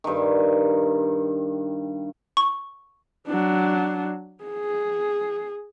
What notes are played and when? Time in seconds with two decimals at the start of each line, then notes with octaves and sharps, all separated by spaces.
0.04 G2 D#3
2.37 C#6
3.28 F#3 D4
4.44 G#4